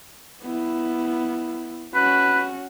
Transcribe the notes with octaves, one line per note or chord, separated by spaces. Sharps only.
B3 E4
C#4 F#4 B4